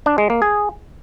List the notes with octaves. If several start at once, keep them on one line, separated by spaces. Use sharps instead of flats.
D4
G#3
A#3
G#4